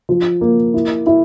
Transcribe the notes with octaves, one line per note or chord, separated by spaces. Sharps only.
F3
A#3
E4
E4